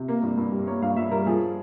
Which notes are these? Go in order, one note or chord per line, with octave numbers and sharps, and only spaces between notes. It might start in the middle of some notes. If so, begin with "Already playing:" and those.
Already playing: C3
A#3
G2
G2
G3
A#3 C#5
G2 F5
G2 E5
G3 A#4
F3 G#4